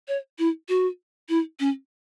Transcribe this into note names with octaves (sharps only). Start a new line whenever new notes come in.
C#5
E4
F#4
E4
C#4